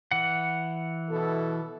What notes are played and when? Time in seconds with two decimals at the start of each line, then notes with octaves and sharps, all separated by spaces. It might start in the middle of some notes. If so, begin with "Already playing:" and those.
0.11 E3 F#5
1.11 B2 E4 A4